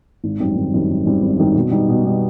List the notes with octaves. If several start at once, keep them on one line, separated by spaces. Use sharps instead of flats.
G#1
F#2 D#3 G3 C4
G#1
F#2 D#3 G3 C4
G#1
F#2 D#3 G3 C4
G#1
F#2 D#3 G3 C4
B2
G3 B3 D#4
B2
G3 B3 D#4